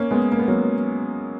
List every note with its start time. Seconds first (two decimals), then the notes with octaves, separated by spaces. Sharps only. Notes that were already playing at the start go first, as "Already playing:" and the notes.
Already playing: A#3 C#4
0.11 G#3 B3
0.32 A#3
0.39 B3
0.48 F#3 A#3